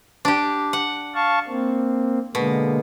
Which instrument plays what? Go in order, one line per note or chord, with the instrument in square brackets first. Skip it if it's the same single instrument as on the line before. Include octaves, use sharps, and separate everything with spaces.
[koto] D4 G4
F#5
[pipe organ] F5 A5 C#6
A#3 C4
[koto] B2 [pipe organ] D3 G#3 A#3